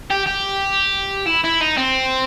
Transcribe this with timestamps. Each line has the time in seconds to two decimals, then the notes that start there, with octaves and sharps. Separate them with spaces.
0.11 G4
0.27 G4
1.26 E4
1.44 E4
1.60 D#4
1.77 C4